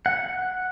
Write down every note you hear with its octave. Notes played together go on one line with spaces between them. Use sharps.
F#5